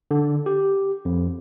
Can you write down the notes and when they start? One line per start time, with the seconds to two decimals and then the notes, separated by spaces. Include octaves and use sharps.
0.11 D3
0.46 G4
1.05 F2